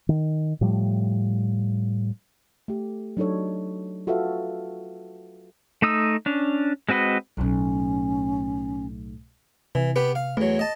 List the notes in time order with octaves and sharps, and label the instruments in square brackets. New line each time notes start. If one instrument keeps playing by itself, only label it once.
[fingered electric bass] D#3
A2 F3 G3
[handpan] A3 G4
F#3 D4 D#4 A4 C#5
F4 F#4 A4 B4 E5 F5
[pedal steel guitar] A3 D#4 D#6 E6
C#4 D4
G#3 C4 F#4 B4 D#5
[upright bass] B1 A2 [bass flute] C#4
[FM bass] C3 [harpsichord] E3
[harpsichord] B3 G4 B4
F5
[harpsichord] E2 F#3 [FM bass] A3
[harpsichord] D#5 A5